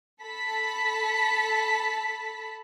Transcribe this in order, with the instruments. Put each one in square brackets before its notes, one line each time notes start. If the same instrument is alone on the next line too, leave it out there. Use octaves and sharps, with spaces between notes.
[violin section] A4 A5 B5 B6